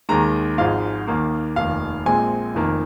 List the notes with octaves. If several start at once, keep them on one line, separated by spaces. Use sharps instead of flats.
D#2 D#3 G#3 A#5
G#1 G#2 F3 G#3 F5
D#2 D#3 A#3
F1 D#2 D#3 F5
A#1 A#2 G#3 C4 G#5
F1 F2 D#3 A#3